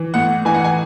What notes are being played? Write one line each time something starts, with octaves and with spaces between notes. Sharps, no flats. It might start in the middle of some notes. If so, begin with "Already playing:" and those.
Already playing: E3
A2 F#5
E3 G#5
F#5
G#5